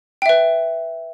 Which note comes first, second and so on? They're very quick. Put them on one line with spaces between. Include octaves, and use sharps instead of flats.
G5 E5 B4